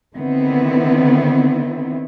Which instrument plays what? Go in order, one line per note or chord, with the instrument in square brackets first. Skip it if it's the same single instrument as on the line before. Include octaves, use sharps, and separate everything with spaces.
[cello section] D3 D#3 B3 C4 E4